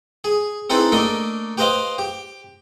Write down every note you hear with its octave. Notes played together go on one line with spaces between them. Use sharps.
G#4
C4 D#4 E4 G#4 A4 B4
A3 A#3 D4 A4 D#5
G4 B4 C5 D#5 F5
G4